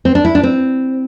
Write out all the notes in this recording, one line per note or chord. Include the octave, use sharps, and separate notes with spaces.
C4
D4
E4
D4
C4